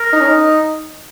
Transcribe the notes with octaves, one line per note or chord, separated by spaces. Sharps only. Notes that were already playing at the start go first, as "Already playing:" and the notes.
Already playing: A#4
D#4
C#4
D#4